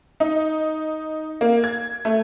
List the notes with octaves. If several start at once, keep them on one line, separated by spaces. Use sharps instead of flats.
D#4
A#3
G#6
A3